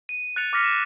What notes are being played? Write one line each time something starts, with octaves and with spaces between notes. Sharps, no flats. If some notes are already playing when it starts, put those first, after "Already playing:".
D#7
F#6 A6 C#7 F7
D6 F6 A#6 B6 C#7
E7